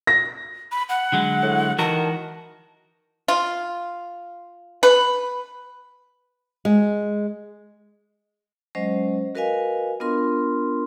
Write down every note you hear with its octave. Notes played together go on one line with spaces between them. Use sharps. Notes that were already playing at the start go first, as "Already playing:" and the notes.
A#6
B5
F#5
D3 F#3 G#3
A2
D#3 E3 F#4 A#4 A5
F4
B4
G#3
F#3 G#3 C#4 C5 D#5
F#4 A#4 B4 D#5 F5 G#5
B3 D4 F4 A#4 C6